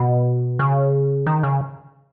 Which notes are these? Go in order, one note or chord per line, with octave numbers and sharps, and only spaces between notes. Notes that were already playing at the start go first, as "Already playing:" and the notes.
Already playing: B2
C#3
D#3
C#3